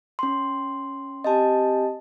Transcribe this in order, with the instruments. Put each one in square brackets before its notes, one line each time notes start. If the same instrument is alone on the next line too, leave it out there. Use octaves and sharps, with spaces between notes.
[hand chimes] C#4 C6
[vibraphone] C4 G4 G#5 [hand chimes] D#5 A5